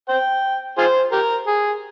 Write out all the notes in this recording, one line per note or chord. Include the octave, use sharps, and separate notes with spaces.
C5 G5
F4 G#4 C5
G4 A#4
G#4